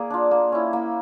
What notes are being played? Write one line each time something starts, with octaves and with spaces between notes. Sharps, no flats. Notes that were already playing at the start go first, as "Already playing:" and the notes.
Already playing: A#3 G#4 D5
D4 F4
A#3
C#4 E4
A#3